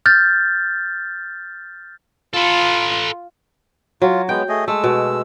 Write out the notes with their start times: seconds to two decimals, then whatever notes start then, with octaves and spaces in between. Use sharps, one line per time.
0.06 F6 G6 A6
2.34 F4 A4 B4
4.02 F#3 F4
4.29 G#3 B3 G5
4.49 A3 G#4 D#5
4.68 G#3 A3 E6
4.84 B2